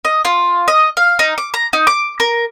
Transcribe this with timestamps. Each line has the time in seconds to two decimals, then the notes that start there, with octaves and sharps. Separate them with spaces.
0.05 D#5
0.25 F4
0.68 D#5
0.97 F5
1.19 D#4
1.38 D6
1.54 A#5
1.73 D#4
1.87 D6
2.20 A#4